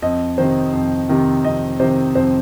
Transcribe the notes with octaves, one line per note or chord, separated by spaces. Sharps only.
F2 D#5
C3 D#3 C5
F2
C3 D#3
F2 D#5
C3 D#3 C5
F2 C5